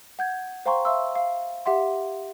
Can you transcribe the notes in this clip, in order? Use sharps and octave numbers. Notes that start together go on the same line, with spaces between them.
F#5 G6 G#6
C5 F5 G5 A#5 C6 C#6
E5 F5 C6 C#6 E6
F5
G4 E5 F#5 C6